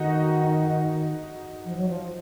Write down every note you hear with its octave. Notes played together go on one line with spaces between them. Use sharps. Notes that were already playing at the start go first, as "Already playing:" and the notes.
Already playing: D#3 D#4 F#4
F3
F#3
F3